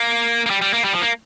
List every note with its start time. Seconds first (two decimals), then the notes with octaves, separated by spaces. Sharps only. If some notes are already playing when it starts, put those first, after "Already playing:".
Already playing: A#3
0.46 A#3
0.50 G3
0.62 G3
0.74 A#3
0.84 G3
0.93 F3
1.02 A#3